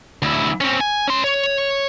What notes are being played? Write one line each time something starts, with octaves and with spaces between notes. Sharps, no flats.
D2 E4
C4 C#4
G#5
C#4 C6
C#5